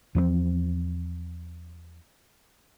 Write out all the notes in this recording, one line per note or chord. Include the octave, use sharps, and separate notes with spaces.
E2 F3 G#3 C4